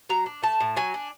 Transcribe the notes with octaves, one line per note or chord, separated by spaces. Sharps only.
F#3 A#5
D4
A3 A5
A2
F#3 G#5
D4